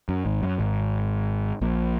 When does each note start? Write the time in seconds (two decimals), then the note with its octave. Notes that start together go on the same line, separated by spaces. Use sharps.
0.09 F#2
0.25 G#1 G#2
0.43 F#2
0.59 G#1 G#2
1.62 A#1 A#2